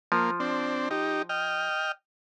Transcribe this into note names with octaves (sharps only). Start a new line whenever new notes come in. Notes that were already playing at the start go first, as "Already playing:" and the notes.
F3 A#3
C4 D4
D#4 G4
D#5 G5 F6